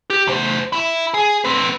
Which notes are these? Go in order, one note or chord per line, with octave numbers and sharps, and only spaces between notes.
G4
E2 C5
E4 E5
G#4
C4 B4